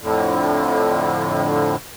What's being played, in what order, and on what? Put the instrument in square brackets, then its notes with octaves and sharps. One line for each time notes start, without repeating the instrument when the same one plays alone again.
[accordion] F2 A2 D3